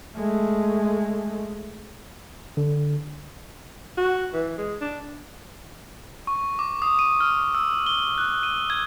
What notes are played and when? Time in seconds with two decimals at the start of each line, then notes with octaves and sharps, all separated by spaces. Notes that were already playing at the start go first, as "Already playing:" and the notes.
0.16 G#3 A3
2.57 D3
3.97 F#4
4.33 E3
4.58 G#3
4.81 D4
6.27 C#6
6.59 D6
6.82 D#6
6.99 D#7
7.20 F6
7.55 E6
7.87 G7
8.18 F#6
8.43 D#7
8.70 G#6